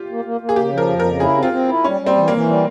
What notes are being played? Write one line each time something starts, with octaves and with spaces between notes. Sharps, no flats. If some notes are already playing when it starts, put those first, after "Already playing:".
Already playing: F4 G4
A#3
A#3
A#3
G#4
C#3 G4
F3
A#4
F2
A#4
C#3
E4 G#4
C4
F4
C4
E4
G3 C#4
G3
C4
E3
E3 A#3
G3